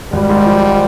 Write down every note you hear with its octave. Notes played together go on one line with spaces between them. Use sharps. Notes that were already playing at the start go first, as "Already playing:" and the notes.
G#1 G3
G#2
F3